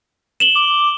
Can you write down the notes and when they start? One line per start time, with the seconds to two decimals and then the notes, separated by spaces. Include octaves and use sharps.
0.40 E7 F#7 G7
0.55 D6